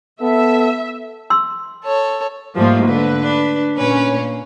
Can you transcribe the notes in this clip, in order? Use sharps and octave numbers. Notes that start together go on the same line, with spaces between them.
B3 A4 E5
C6 E6
A4 C#5
G#2 F3 G3 A3 A#3
D3 B4
D4
A#2 C#4 B4
A#3